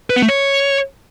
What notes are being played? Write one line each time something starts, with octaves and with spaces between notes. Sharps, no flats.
B4
B3
A3
C#5